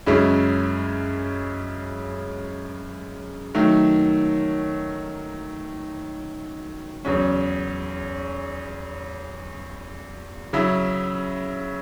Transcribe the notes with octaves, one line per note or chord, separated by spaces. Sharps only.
F#2 C#3 G#3 C#4 E4
D#3 F#3 A3
E2 C#3 F#3 C#4
C#3 F#3 C#4 E4